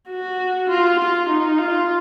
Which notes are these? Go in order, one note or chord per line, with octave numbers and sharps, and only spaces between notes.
F#4
F4
F4
D#4
F4